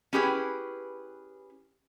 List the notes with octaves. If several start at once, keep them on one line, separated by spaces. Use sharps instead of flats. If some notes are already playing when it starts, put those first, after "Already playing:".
C#4 E4 G4 G#4 B4 G5